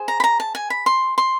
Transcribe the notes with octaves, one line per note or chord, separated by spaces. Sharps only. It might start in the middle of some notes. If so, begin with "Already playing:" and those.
Already playing: G#4 C5
A#5
B5
A#5
A5
G#5
B5
C6
C6